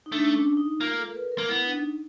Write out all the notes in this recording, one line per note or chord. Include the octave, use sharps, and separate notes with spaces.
D#4
A3 D4
C#4
D4
D#4
A#3 F4
A4
A#4
B4
A#4
A#3
B3 E4
D4
D#4